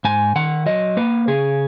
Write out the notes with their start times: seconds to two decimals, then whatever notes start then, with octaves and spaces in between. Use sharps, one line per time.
0.05 G#2 G#5
0.36 D#3 F#5
0.66 F#3 D#5
0.97 A#3 B4
1.27 C#3 G#4